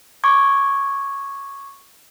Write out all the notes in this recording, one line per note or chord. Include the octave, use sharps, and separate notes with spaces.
C#6 D6 G#6